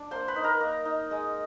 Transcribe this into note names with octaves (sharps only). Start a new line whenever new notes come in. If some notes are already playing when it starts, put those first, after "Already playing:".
Already playing: D4 D6
A#3 C5 C6
B4 B5
D#4
A#4 A#5
A#3
D#4
G#3